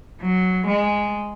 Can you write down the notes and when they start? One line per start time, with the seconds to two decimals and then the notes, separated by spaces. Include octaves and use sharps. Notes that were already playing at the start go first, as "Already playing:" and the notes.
0.21 F#3
0.66 G#3